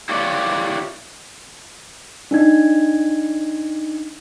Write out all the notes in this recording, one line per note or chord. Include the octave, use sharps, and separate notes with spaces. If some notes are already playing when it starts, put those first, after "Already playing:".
E4 F4 G4 C#5 D5
D4 D#4 G#6